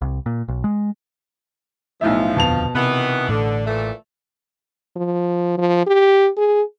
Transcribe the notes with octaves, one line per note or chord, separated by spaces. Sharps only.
C2
A#2
B1
G#3
B1 A2 F3 E5
D#1 F2 B2 D3 A5 F7
C3 D#3 E3 B3
A1 A2 D3
A#2 E3 A3
F3
F3
G4
G#4